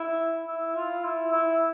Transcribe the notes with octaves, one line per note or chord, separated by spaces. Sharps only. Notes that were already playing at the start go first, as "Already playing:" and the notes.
Already playing: E4
E4
F4
E4
E4